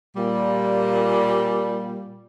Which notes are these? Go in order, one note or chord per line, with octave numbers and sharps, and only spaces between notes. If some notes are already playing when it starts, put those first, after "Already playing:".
A#2 G3